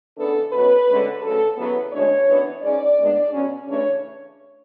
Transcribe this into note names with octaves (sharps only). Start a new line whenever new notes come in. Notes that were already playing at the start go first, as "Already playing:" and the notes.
C#3 E3 B3 D4 A4
B2 F#3 C#4 B4
D2 D3 G#3 C#4
D2 C#3 F#3 A4
E2 C#3 F#3 B3 B4
D2 C#3 G#3 D4 C#5
F#2 E3 B3 D4
G#2 G#3 C#4 D5
A2 G#3 B3 D4
B2 F#3 C#4
C#3 E3 A3 D4 C#5